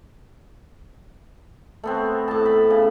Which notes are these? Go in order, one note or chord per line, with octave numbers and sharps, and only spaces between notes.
A3 B3 C4
A2 A5
B5
C#3